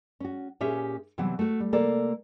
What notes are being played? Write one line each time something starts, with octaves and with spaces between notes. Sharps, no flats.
C#4 F#4
A#2 C#4 G4 G#4 C#5 E5
C3 E3 F#3 G3 B3 F#5
A3 F#4
G3
C3 A#3 A4 D5